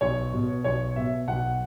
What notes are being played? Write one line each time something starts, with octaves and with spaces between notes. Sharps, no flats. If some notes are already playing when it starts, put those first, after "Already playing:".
B1 C#5
B2
B1 C#5
B2 E5
B1 F#5